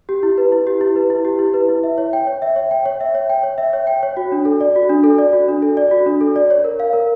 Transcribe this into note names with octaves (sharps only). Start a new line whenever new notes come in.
G4
E4
B4
E4
G4
E4
B4
E4
G4
E4
B4
E4
E5
C#5
G5
C#5
E5
C#5
G5
C#5
E5
C#5
G5
C#5
E5
C#5
G5
C#5
F#4
D4
A4
D5
F#4
D4
A4
D5
F#4
D4
A4
D5
F#4
D4
A4
D5
C#5
A#4
F5
A#4